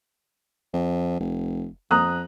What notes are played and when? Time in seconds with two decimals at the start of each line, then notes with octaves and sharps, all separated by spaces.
0.74 F2
1.20 F1
1.91 F2 A#5 D#6 F#6